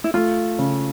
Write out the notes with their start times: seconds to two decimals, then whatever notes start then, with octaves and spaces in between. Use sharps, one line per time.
0.04 E4
0.14 A3 F4
0.59 C#3